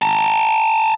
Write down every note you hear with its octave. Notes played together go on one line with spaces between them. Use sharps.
A5 A#5